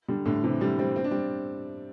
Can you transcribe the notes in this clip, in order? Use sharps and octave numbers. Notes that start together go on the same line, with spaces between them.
D3 G3
A2 D3
C3 E3
D3 G3
G3 C4
C4
D4
G3 C4